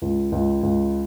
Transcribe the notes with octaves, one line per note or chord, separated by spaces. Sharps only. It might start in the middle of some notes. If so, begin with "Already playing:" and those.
C#2
C#2
C#2